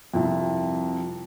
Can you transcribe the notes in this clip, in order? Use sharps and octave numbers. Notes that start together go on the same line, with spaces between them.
C2 F2